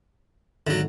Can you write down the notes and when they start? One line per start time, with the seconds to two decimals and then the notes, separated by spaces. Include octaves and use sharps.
0.67 G#1 D3 F#3 A4